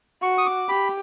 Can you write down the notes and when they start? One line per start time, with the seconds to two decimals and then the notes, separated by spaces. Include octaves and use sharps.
0.22 F#4 C#6
0.38 D#6
0.46 D6
0.69 G4 B5